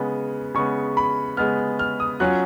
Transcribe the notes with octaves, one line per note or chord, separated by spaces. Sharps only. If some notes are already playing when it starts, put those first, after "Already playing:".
Already playing: C#3 G#3 B3
C#3 G#3 B3 C#6
B5
C#3 G#3 B3 F6
F6
D#6
F#3 C#4 F4 F#6